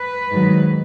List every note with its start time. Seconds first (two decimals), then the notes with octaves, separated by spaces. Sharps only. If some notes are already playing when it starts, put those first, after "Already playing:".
Already playing: B4
0.31 G#2 D#3 F#3